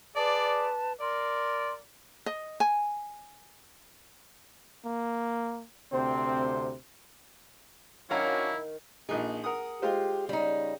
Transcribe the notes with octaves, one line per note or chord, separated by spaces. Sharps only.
G#4 B4 D5 A5
A#4 D5 C6
D#5
G#5
A#3
D2 C3 C4 C5
D#3 F#3 C#4 D4 E4 A#4 F5 A#5
A#1 D#4 G#4
A#4 F#5 D#6
G#3 F4 G4 C5
C#3 G3 D#4